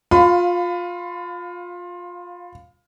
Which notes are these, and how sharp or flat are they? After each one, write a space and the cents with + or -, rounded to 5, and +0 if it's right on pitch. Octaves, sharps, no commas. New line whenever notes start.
F4 +20 F5 +0 B5 +35